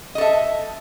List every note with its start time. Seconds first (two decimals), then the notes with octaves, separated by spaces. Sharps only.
0.15 D#5
0.18 A4
0.21 E5